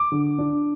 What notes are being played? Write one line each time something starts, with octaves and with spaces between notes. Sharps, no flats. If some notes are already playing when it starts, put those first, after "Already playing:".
Already playing: D6
D3
D4